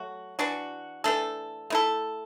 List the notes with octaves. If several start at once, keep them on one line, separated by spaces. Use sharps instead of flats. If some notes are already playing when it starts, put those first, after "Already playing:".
Already playing: F#3 A3 F#4
E3 D4 F#4
E3 A3 D4 A4
A3 E4 A4